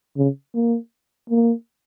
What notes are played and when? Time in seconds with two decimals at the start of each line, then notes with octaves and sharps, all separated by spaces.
0.17 C#3
0.54 A#3
1.30 A#3